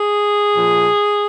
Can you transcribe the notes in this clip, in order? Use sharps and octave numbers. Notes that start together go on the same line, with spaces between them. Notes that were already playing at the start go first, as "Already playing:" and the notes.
Already playing: G#4
A#2 F3